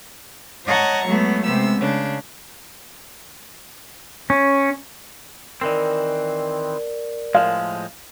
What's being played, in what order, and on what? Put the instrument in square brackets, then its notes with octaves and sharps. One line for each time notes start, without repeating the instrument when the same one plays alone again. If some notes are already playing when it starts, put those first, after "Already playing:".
[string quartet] C#5 D#5 F#5 A5 A#5 C#6
F#3 G#3 A3 B3
C3 G#3 B3 E6
C#3 D4
[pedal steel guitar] C#4
[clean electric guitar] D#3 E3 C4 [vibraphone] A#4 D5
[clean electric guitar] A2 F3 G#3 [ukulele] F5